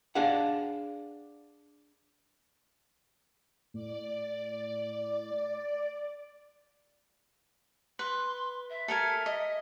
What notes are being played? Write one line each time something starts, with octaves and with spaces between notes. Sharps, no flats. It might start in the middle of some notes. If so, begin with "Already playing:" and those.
D4 G#4 F5 F#5
A2 D5
B4 C6
E5
A4 A#4 G#5
D#5